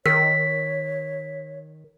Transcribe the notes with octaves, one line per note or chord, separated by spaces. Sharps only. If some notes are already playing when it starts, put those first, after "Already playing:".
D#3 A#4 C#5 B6